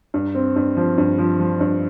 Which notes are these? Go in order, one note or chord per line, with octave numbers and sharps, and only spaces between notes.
G2
C4
G2
F3
G2
F3
F3
G2